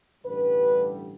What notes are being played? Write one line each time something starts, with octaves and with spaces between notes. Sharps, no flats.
A1 G2 D3 G3 B4